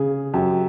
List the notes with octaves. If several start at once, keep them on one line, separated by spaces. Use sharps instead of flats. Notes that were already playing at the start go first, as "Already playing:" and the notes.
Already playing: C#3 G#4
F#2 G4